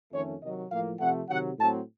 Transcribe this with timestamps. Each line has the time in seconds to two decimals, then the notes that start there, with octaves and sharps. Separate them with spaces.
0.12 F2 D#3 A3 C#4 C#5
0.42 C3 D#3 F#3 D#5
0.71 A2 F3 A#3 F5
1.00 C3 F3 A3 C4 F#5
1.29 C3 D#3 F#3 F#5
1.58 A2 F#3 C4 A5